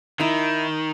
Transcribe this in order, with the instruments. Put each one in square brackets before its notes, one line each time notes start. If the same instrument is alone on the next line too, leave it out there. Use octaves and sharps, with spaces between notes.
[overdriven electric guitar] D#3 [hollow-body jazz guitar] D#4 E4